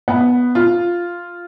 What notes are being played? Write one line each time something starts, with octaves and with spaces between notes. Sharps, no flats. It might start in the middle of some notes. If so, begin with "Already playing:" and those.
B3
F4